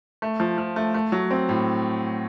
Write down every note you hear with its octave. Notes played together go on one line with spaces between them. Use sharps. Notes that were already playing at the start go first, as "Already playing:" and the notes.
A3
F3
F3
A3
A3
F#3
C4
A2